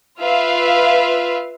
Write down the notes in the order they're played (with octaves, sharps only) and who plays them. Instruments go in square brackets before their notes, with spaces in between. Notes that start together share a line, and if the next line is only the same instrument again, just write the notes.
[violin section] F4 B4 E5 F5